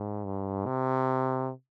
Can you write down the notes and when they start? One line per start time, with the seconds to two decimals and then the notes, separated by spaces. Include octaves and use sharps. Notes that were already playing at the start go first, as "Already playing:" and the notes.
Already playing: G#2
0.25 G2
0.66 C3